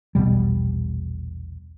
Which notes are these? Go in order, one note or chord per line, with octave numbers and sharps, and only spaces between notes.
A#1 E2 B2 G3